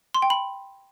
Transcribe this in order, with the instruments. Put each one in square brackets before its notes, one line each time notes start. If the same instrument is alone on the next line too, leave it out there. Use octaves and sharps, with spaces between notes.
[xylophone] C6
G5
B5